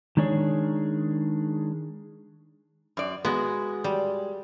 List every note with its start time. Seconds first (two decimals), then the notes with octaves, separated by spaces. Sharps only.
0.17 D#3 G#3 D4 G#4 C#5
2.97 F#2 D5
3.25 G#3 B3 F#4
3.84 G3